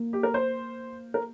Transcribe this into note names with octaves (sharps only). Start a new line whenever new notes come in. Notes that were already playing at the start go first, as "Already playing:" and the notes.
Already playing: A#3
G4
A#4
C5
A#4